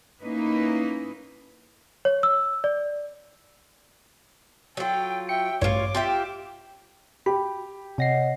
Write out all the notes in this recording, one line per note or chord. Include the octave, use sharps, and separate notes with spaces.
A#3 C#4 D#4 E4 B4
C#5
E6
D5
F#3 F4 A4 G5
E5 G5 C#7
A1 G2 F4 C#5 D6
F4 G4 E5
G4 B5
C3 C#5 D#5 F#5 A#6 C7